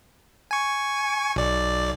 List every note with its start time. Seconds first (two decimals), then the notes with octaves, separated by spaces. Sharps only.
0.51 G#5 C#6
1.36 B1 D5